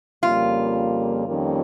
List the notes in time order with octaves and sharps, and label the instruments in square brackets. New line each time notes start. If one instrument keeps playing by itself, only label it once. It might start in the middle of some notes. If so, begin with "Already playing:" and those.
[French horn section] F2 C#3 G3 A#3 [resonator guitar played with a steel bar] F4
[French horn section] F2 D#3 G3 A#3 C#4